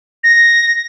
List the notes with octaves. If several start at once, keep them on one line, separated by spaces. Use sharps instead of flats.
A#6